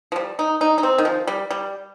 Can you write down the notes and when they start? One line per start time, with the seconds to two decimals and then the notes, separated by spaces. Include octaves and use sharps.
0.12 F3
0.16 G3
0.39 D#4
0.61 D#4
0.78 D#4
0.83 C4
0.98 D#3
1.05 F3
1.27 G3
1.51 G3